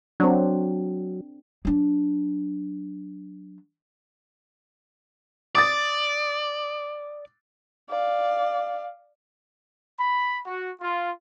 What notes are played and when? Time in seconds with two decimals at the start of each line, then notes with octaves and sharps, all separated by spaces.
0.20 F#3 C4 D4
1.65 F#3 D4
5.55 D5 D6 D#6 A6
7.89 D5 F5
9.99 B5
10.46 F#4
10.81 F4